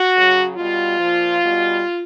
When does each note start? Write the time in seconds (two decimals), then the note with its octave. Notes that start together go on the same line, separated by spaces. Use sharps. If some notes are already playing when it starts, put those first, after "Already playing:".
Already playing: F#4
0.14 C#3 F#3
0.55 B2 G3 F4
0.97 A#2 F3
1.40 B2 G3